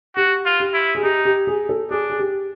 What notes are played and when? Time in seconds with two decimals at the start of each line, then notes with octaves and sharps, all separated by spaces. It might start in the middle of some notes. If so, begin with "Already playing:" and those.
0.16 F#4 G4
0.45 F4
0.60 G4
0.74 E4
0.95 G#4
1.03 D#4 G4
1.25 G4
1.47 G#4
1.69 A4
1.91 D4 G#4
2.10 G#4
2.19 G4